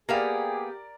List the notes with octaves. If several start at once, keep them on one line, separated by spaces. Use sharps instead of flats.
A#3 B3 G4 G#4 A#4 D5 F5